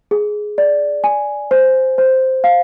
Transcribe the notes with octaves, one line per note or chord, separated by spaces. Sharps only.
G#4
D5
G#5
C5
C5
F5